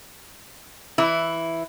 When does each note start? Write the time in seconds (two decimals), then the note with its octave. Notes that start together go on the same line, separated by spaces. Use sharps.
0.98 E3 E4